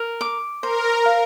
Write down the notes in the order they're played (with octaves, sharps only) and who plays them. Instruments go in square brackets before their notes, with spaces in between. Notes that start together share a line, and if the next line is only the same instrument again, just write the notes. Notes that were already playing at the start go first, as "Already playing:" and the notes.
Already playing: [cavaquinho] A#4
D6
[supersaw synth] A#4 [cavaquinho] C5
[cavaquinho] F5